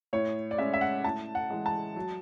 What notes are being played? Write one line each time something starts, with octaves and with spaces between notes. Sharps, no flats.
A2 C#5
D5
G#3 C#4 E5
E5
F#5
A2 A5
F#5
E3 G#3
A5
F#3